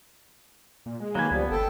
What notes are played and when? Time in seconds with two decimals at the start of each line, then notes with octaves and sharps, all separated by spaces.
0.86 A#2
1.00 G#3
1.15 D#3 F#3 A#3 F#4 B4 F5 G#5
1.31 C#2 F3 G3 B3
1.51 G1 A4 G5 A5